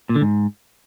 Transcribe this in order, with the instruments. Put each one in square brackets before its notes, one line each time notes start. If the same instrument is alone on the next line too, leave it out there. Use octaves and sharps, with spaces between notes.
[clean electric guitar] A#2
D3
G#2